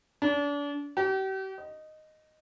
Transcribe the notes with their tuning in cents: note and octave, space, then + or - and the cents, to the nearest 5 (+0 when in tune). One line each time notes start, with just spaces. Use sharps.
D4 -35
G4 -40
D#5 -5